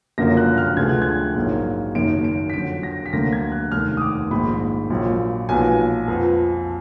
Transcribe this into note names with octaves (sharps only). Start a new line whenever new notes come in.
F#1 F#2 D3 F3 A#3 A#6
F#6
F6
D2 D3 F3 G#3 B3 G#6
F#6
G#6
A#1 G#2 F#3 A#3
F#1 F#2 D#3 D7
D7
B6
F2 D3 F#3 D7
A#6
B6
D2 D3 F#3 A#3 A#6
G#6
F#6
F1 D#2 D#3 F6
D#6
D6
A#1 G#2 D#3 B5
A#1 A#2 F#3
B1 A#2 F3 B3 G#5
F2 F3 B3